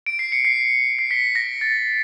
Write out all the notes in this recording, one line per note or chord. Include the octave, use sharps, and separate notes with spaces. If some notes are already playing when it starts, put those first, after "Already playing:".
D7
C7
C#7
C7
C7
B6
A#6
A6